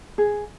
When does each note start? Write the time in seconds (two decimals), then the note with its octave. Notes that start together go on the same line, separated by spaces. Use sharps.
0.18 G#4